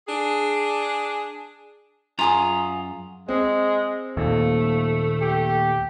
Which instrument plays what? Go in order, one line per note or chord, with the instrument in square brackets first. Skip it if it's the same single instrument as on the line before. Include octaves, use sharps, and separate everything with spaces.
[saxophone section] D4 G#4
[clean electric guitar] F#2 A#5 [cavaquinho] F4 G#4 D#6
[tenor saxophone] G#3 [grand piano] C4
[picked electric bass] D#2 A#2 [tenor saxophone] A3
[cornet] G4